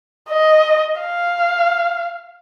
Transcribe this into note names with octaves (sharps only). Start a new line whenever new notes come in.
D#5
F5